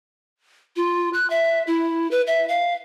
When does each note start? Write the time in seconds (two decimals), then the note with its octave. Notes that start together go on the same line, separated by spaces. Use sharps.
0.76 F4
1.13 F#6
1.30 E5
1.67 E4
2.11 B4
2.27 E5
2.49 F5